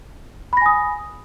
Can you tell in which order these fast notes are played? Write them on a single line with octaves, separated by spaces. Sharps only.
B5 A#6 G#5 D#6